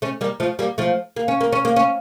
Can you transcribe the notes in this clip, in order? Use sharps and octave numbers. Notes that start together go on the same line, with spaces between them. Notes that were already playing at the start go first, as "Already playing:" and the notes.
A3 C#4
G3 A#3
F3 A3
G3 A#3
F3 A3
A#3
C#4
A#3
C#4
A#3
C#4